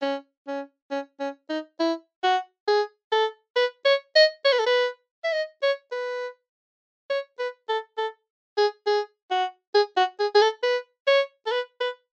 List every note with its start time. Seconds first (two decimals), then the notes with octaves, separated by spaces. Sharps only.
0.02 C#4
0.47 C#4
0.91 C#4
1.20 C#4
1.50 D#4
1.80 E4
2.24 F#4
2.68 G#4
3.12 A4
3.56 B4
3.85 C#5
4.16 D#5
4.45 C#5
4.52 B4
4.59 A4
4.66 B4
5.24 E5
5.33 D#5
5.62 C#5
5.92 B4
7.10 C#5
7.39 B4
7.69 A4
7.98 A4
8.57 G#4
8.87 G#4
9.31 F#4
9.75 G#4
9.97 F#4
10.20 G#4
10.35 G#4
10.42 A4
10.63 B4
11.07 C#5
11.47 A4
11.52 B4
11.81 B4